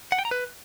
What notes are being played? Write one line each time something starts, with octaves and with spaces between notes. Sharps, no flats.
F#5
G5
A#5
B4